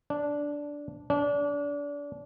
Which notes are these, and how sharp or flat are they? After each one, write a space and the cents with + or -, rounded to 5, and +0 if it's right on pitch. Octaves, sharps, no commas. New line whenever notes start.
D4 -10
D4 -30